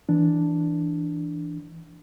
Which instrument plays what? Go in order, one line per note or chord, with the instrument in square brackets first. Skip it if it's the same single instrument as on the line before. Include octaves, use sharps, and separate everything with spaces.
[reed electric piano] E3 D4